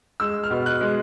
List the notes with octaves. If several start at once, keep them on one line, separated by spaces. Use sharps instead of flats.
G#3 E6
F6
B2
F#6
G#3